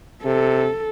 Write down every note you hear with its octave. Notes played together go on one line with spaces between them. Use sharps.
C3 A4